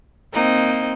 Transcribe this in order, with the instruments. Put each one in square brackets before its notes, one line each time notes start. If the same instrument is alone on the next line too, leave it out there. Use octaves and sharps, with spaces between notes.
[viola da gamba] A#3 C4 D#4